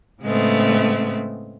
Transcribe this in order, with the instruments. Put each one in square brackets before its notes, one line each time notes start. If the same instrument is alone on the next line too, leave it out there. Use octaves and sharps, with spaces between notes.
[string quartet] A2 C#3 G#3 A3 B3 C4